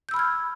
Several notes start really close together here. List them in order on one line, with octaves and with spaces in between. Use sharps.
G6 E6 B5 F6 G#6